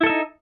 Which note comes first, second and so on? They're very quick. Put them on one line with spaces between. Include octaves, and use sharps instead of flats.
E4 A4 E5 D#4